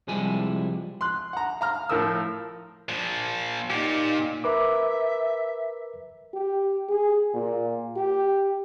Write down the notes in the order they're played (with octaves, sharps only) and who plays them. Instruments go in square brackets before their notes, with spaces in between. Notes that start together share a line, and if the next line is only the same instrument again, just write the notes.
[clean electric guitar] C2 F3 G3 G#3 E4 G#5
[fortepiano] C6 F#6
F#5 A#5
F5 A#5 F6
A2 F3 A#4 D#6 E6
[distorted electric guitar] A#2 F3
[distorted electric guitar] A#2 [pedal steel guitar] D#4 G4
[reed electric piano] A#4 B4 D6 [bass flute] E5
[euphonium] G4
G#4
A#2
G4